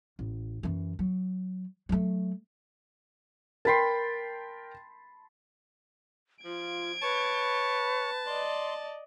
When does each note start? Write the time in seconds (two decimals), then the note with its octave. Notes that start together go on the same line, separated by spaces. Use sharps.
0.19 A1
0.63 F#2 E3
0.99 F#3
1.89 F#3 A3
3.65 A#4 G5 A5 B5 C6
6.45 F3 F4 G#6 D7
7.02 B4 C#5 A5
8.27 D5 D#5 C6